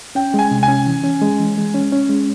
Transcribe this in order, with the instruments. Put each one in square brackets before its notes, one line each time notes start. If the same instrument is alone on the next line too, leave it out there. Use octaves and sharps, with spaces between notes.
[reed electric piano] C#4 [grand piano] G5
[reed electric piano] G#3 [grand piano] G#5
[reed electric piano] C3
[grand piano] G#5
[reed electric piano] C#4
E3
C#4
G#3
E3
G#3
C#4
C#4
G#3